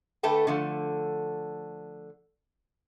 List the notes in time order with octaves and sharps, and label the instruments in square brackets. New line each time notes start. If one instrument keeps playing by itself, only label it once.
[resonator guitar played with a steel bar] D3 A3 A4 B4 G5
D3 F3 A3